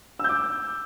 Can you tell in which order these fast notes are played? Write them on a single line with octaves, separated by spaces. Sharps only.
E6 G6 D6